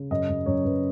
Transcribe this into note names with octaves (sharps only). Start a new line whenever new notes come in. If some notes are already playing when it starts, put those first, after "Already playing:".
Already playing: C#3
F#2 D#5
F#2
F#2 C#5
F#2 B4